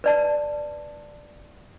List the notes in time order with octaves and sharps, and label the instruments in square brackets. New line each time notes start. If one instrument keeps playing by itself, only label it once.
[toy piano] B4 D5 A5